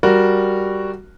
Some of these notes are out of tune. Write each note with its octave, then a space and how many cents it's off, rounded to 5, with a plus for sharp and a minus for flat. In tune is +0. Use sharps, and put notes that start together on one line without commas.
G3 +0 F#4 +0 A#4 +0